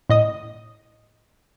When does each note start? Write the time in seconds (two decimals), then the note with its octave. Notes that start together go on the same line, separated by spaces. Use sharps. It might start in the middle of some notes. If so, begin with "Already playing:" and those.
0.10 A2 D#5 D#6